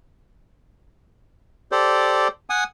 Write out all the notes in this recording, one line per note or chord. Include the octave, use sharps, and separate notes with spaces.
G4 A4 C5 D5
F#5 G#5 D#6